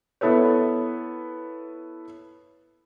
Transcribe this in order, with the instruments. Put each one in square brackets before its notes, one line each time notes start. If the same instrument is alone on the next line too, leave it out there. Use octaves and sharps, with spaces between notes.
[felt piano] B3 E4 A4 B4 C#5